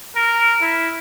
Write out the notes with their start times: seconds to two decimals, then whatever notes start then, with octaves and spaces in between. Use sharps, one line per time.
0.16 A#4
0.61 E4